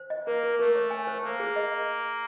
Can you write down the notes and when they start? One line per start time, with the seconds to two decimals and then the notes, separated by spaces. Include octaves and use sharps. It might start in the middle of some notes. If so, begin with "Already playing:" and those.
Already playing: C5
0.10 D#5
0.26 A#3 A#4
0.43 A#4
0.59 A3 A#4
0.76 C#5
0.91 G#5
1.07 C5
1.23 A#3 C5
1.40 G#4
1.56 D#5